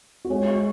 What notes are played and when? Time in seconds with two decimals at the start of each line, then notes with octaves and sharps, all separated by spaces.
0.25 F#4
0.30 G#3 G#4 C#5
0.47 E5 C#6